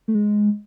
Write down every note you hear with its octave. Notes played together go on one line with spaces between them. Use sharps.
A3
G#3